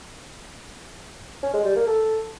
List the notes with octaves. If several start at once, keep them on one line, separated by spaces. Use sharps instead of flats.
C#4
G#3
G3
A#3
A4